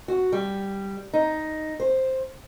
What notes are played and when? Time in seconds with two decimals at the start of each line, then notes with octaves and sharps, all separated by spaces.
0.08 F#4
0.32 G3
1.13 D#4
1.80 C5